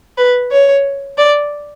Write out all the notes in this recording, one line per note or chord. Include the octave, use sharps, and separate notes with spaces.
B4
C#5
D5